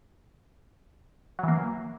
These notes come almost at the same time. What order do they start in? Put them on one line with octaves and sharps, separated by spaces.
F#3 E3 A#3